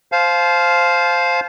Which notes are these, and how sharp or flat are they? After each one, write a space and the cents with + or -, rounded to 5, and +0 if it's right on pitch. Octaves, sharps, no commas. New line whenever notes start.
C5 +0 F5 +0 A5 -35